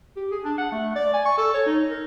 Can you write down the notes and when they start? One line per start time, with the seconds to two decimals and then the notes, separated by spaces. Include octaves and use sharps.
0.16 G4
0.31 G#4
0.44 D4
0.58 F#5
0.72 A3
0.95 D5
1.13 G#5
1.25 C#6
1.38 A4
1.54 C#5
1.66 D#4
1.90 A#4